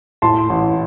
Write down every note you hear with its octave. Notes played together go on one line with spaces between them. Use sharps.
A2 A5 C6
A1